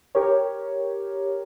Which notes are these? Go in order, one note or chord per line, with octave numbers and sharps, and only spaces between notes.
G4 A#4 C#5